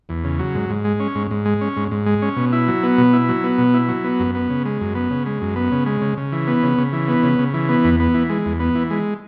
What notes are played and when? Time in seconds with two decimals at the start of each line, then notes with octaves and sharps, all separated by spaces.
0.09 E2
0.24 C#3
0.39 F#3
0.55 G#2
0.70 G#2
0.84 G#3
1.00 C#4
1.15 G#2
1.31 G#2
1.45 G#3
1.61 C#4
1.76 G#2
1.91 G#2
2.06 G#3
2.22 C#4
2.36 B2
2.52 E4
2.68 F#3
2.83 B3
2.98 B2
3.13 E4
3.29 F#3
3.44 B3
3.58 B2
3.74 E4
3.88 F#3
4.04 B3
4.20 F#2
4.35 B3
4.50 C#3
4.65 G#3
4.81 F#2
4.95 B3
5.10 C#3
5.26 G#3
5.41 F#2
5.56 B3
5.72 C#3
5.86 G#3
6.01 C#3
6.17 C#3
6.32 E3
6.47 B3
6.63 C#3
6.78 C#3
6.93 E3
7.08 B3
7.23 C#3
7.39 C#3
7.54 E3
7.69 B3
7.84 E2
8.00 B3
8.14 E3
8.29 G#3
8.46 E2
8.60 B3
8.75 E3
8.90 G#3